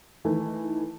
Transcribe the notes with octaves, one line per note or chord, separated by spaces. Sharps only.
D#3 E3 A3